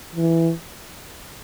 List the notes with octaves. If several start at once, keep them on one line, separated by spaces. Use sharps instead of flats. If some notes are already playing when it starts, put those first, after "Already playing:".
E3